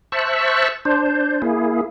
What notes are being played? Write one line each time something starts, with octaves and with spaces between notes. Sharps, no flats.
C5 E5 A5 C#6 E6 F#6
D4 C5
A#3 E4 G#4